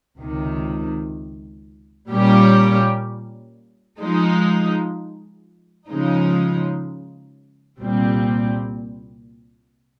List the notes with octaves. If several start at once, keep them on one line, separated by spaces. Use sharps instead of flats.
C#2 C3 D#3
A#2 G3 C#4 G4 A#4
F3 G#3 D#4
C#3 F3 G#3 D#4
C2 A#2 G3 C4